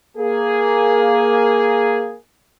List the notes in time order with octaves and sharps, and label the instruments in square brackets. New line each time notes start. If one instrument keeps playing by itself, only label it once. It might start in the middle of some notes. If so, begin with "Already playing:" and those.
[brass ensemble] A#3 G#4